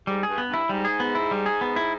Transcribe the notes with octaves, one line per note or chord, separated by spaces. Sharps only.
G#2 G3
G#4
G2
B3
G2
E4
G#2 G3
G#4
B3
E4
G3
G#4
B3
E4